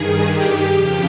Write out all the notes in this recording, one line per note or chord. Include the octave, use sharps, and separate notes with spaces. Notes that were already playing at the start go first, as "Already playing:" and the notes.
Already playing: G2 D#3 G#4
G4
F2 C#3 F3 G4